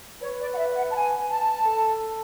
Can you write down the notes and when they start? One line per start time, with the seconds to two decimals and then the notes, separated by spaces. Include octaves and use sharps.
0.22 B4 C#5
0.41 D5
0.54 F#5
0.58 E5
0.76 F#5
0.90 A5
0.95 G#5
1.30 A5
1.66 A4